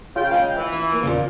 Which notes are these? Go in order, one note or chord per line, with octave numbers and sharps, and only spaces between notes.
C#3 F4 G5
G#3 F5
E3
E4
A#3
E2 A#2 C#3 F3 A#3